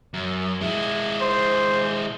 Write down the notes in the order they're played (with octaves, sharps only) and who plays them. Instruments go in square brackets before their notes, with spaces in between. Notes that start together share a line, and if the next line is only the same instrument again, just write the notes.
[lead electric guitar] F#2
G#3 E4
[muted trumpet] C5